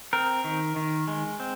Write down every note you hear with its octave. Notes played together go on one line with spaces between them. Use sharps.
C4 A#4
D#3
D#3
G#3
C4